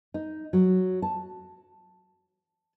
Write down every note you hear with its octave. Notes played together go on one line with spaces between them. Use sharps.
D#4
F#3
A5